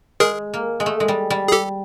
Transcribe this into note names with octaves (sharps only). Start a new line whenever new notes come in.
G#3 G#4 A#4
A#3
G#3
A3
G#3
G3
G3
G#4
G4 A4